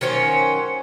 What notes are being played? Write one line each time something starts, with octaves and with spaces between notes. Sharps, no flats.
D#3 F#3 C#4 C5